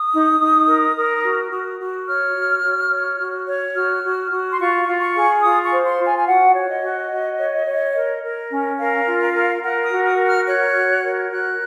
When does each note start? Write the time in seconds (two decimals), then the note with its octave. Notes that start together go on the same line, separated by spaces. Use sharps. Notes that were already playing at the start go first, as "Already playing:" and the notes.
Already playing: D#6
0.11 D#4
0.39 D#4
0.68 A#4
0.96 A#4
1.24 F#4
1.51 F#4
1.79 F#4
2.07 C#5 F6
2.35 F#4
2.63 F#4
2.91 C#5
3.19 F#4
3.48 C#5
3.75 F#4 F6
4.03 F#4
4.31 F#4
4.52 C6
4.59 F4 C#6
4.87 F4
5.00 C#6
5.15 G#4
5.43 F4 D#6
5.64 C#6
5.71 C5
5.85 C6
5.98 F4
6.06 G#5
6.18 G#5
6.27 F#4 F#5
6.55 C#5
6.69 D#5
6.83 F#4
7.11 F#4
7.38 C#5
7.67 C#5
7.95 A#4
8.23 A#4
8.50 C#4
8.78 A#4 F5
9.06 F4
9.21 F5
9.35 A#4
9.62 A#4 F#5
9.84 D#6
9.91 F#4
10.05 D#6
10.18 A#4
10.26 F6
10.46 C#5 F#6
10.74 F#4
11.03 A#4
11.31 F#4 F#6